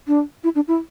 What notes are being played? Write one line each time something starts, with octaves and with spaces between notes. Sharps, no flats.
D4
E4
D4
E4